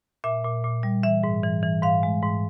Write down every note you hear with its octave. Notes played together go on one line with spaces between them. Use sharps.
A#2 E5
A#2
A#2
G3
E3 E5
G#2
E3
E3
G#2 F5
G#3
G#2